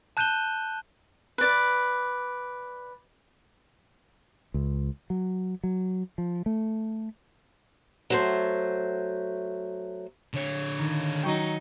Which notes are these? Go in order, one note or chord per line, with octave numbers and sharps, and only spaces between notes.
A5 F#6 G6 D#7 E7 G7
B4 D5
C#2
F#3
F#3
F3
A3
F#3 A3 C5
D3 C#5
D#3
F#3 D#4 G5 C#6